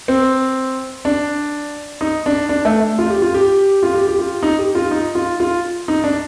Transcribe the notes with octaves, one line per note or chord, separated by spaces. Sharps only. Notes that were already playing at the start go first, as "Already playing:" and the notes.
C4
D4
D#4
D4
D4
A3
F4
G4
F4
G4
F4
G4
G4
F4
D#4
G4
F4
D#4
F4
F4
D#4
D4